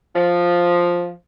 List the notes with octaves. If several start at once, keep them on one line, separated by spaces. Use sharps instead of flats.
F3